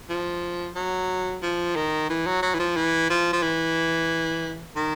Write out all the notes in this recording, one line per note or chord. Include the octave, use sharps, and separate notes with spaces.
F3
F#3
F3
D#3
E3
F#3
F#3
E3
F3
E3
F3
F3
E3
D#3